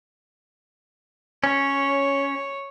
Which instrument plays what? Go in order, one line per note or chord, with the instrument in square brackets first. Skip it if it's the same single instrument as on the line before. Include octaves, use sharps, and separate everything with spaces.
[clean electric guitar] C#4 [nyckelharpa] C#5